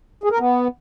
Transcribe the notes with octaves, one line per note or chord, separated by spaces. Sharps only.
G#4
A#4
B3